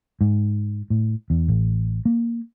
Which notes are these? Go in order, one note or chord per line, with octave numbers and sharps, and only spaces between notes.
G#2
A2
E2
A1
A#3